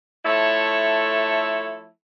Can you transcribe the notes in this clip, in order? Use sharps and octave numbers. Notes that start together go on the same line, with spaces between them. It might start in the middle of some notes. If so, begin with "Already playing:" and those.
F3 A3 E4 A4 C#5